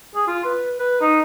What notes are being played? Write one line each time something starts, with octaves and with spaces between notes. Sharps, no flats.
G#4
F4
B4
B4
D#4